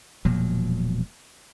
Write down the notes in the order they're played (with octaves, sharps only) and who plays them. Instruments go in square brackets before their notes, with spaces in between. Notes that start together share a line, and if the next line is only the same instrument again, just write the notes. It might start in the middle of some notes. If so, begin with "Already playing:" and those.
[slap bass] E1 A#2 F3 F#3